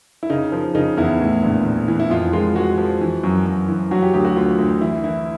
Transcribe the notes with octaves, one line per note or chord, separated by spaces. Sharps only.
E4
C#3 D#4
F3
C#3 D#4
E2 E4
A2
A#1
A#1
E3
E4
F2 F4
G#3 F4
G#3 F#4
F3
E3
F#2
F#2
E3
F#3 F#4
G4
D2 G4
F#4
D2 F4
D2
E3 E4
E3 E4